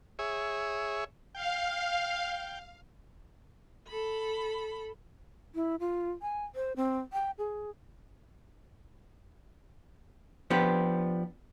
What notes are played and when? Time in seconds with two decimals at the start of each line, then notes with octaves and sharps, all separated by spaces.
0.19 G#4 C#5 E5
1.35 F5 G5
3.87 A4 B5
5.55 E4
5.80 F4
6.22 G#5
6.55 C5
6.76 C4
7.13 G5
7.38 G#4
10.50 F3 B3 D4 G4